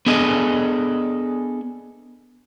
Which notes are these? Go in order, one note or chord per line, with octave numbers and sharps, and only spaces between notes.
B3 D4 G#4 A4 D#5